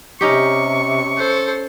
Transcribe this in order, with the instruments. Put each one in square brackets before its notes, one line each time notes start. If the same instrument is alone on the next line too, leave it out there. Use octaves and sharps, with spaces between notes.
[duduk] C3 [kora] C#4 D#4 G4 [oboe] C#6
[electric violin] A4 C5